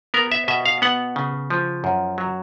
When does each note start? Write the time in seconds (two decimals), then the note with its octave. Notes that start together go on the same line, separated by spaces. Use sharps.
0.14 B3 A#4
0.32 E5
0.48 B2 E5
0.66 F5
0.82 B3 F#5
1.16 C#3
1.50 F3
1.84 F#2
2.18 F#3